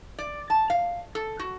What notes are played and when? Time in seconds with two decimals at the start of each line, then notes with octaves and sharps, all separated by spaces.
0.18 D5
0.50 A5
0.70 F5
1.15 A4
1.39 F#4